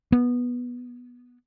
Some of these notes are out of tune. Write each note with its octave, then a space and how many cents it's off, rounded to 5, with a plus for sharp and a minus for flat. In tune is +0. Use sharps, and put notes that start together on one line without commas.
B3 -10